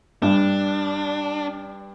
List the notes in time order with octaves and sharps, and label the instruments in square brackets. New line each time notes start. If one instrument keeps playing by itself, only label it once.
[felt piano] G2 [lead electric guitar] D4